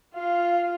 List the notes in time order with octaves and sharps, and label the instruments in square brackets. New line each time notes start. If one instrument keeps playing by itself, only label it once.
[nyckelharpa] F4 [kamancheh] F5